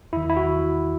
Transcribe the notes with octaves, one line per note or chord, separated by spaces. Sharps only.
E2 D#3 E4
E4
F#4